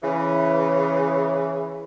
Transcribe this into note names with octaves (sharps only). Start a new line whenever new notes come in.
C#3 E3